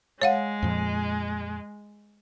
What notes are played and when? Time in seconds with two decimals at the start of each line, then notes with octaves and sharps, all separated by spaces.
0.22 G#3 C#5 F5 F#5
0.62 F2 A#2 F3